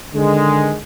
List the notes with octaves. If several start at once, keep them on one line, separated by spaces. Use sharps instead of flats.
D3 D#3 G#3